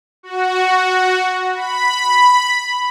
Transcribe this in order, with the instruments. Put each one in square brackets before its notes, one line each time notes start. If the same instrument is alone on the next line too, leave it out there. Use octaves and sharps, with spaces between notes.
[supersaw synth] F#4
B5